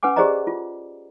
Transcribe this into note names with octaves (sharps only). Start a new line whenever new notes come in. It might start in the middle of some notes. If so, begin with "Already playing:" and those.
C#4 B4 F#5 G#5 D6
G4 G#4 C5 D5 D#5 A#5
F4